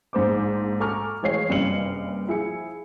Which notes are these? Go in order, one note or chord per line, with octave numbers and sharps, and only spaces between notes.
A#1 G#2 C5 D6
A4 G#5 A#5 C#6 D6 F6
E3 G#3 C#5 F5 C7
F#1 G2 C3 C#4 C#7 F#7
F3 E4 G#4 C#7